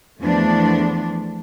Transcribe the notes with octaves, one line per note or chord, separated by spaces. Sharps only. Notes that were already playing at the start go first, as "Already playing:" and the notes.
E2 F3 A3 B3 D4